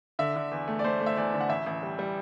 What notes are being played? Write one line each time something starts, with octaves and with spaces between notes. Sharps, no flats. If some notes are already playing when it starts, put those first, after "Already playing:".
D3 E5
D3
E2
A3
D5
A3 C5
A3
E5
E2 D5
D3
F#5
A1 E5
A1
G3
G3